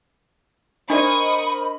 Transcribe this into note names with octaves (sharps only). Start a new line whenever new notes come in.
D4 A#4 C5 D5 D#5 B5 C#6 D#6